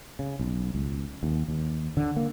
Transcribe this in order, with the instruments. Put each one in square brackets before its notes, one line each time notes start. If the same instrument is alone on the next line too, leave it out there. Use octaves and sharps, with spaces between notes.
[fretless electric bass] C#3
B1
C#2
D#2
D#2
D3
A#3